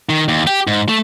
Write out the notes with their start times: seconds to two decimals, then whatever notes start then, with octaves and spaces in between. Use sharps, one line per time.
0.09 D#3
0.28 D#2
0.47 G4
0.67 G#2
0.89 A3